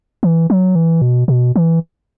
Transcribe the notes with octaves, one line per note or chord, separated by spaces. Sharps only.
E3
F#3
E3
B2
B2
E3